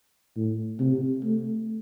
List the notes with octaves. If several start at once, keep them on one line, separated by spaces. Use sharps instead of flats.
A2
C3
A3